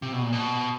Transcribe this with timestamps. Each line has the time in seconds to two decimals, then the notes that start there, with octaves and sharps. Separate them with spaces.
0.02 C3
0.13 B2
0.22 A#2
0.32 B2